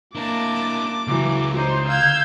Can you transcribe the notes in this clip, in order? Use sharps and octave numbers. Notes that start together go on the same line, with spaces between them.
A#3 D4 E4 A5 D6
C#2 E3 F#3
D#4 C5
F5 E6 G6 G#6